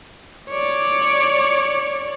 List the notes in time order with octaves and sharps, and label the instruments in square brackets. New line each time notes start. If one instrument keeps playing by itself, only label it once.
[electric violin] C#5 D5